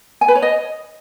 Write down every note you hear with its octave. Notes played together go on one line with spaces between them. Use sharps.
G#5
B4
C#5
D#5